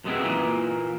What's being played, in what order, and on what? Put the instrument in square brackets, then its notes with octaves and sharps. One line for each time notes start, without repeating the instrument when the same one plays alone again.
[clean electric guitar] F#2 C3 G#3 B3 C4 E4
A#2 E3 A#3